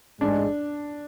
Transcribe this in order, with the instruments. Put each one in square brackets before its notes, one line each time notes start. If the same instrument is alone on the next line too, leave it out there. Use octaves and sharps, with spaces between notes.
[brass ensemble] A1 G#2 G#3 [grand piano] D4